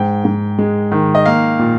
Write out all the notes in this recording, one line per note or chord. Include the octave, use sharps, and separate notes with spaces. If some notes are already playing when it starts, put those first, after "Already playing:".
Already playing: G#2 G5
G#2
G#3
D#3
D#5
A#3 F5
A#2